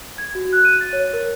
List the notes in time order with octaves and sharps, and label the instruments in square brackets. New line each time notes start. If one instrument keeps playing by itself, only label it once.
[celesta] G#6
F#4
F#6
D#7
A6
C#5
A#4